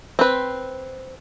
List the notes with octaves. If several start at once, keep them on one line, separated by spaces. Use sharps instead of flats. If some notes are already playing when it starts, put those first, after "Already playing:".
C4 B4